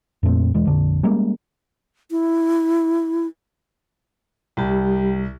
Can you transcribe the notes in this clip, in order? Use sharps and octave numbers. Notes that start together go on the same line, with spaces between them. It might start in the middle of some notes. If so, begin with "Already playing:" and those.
F2 A#2 A3 C4
E1 E3 G#3
A#1 F2 D3 D4
G3 G#3 A#3 C#4
E4
C2 G3 G4